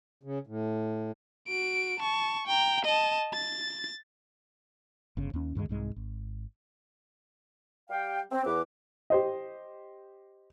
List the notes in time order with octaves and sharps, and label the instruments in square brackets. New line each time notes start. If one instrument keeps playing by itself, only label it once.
[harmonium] C#3
A2
[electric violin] F#4 D7
A5 C#6
G5 A#5
D#5 A5
A6
[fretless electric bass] G1 C#3
D#2 C#4
D2 G2 D#3 G#3
C2 G#2 G#3
G#1
[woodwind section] G3 G4 F5 G5
C4
E2 B4 D6
[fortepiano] G4 C5 D#5